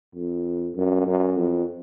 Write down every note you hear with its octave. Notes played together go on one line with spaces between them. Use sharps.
F2
F#2
F#2
F2